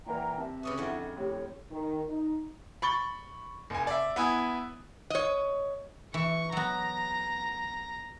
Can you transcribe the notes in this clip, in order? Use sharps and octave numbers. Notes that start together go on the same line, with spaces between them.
A#2 E3 A#3 F#5 G5 A#5
C3 E5 A5
C#3 C#4 F#4 B4 D6 D#6
F2 D3 E4 G#4 F#5
A2 G4 C#5
D#3
D#4
B5 C#6 A6 G7
F1 G#5
D5 E5
B3 E4 G#5 D#6
C#5 D#5
E3 C#6
F#3 B3 A#5